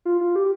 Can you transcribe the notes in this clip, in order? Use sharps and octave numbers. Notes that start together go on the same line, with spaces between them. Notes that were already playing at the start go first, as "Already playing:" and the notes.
F4
F4
G4